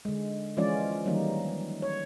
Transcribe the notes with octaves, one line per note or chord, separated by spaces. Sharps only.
D3 G#3
E3 F3 G#3 C#4 F4 D5
D#3 E3 F#3 G3 A#3 D#4
C#5